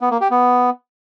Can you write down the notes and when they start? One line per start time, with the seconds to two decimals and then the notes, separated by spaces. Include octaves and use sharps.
0.01 B3
0.11 A#3
0.21 G4
0.31 B3